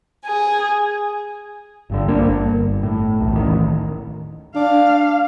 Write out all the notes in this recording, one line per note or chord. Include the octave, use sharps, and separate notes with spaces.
G#4
G1 G2 D3
A#1 A#3 D4
G1
A2
B1 E2 A2
D1 A1 D#3
D4 F5